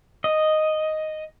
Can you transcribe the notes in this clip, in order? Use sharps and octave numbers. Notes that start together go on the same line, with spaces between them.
D#5